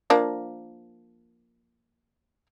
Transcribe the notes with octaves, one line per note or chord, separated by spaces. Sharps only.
F3 A#3 D4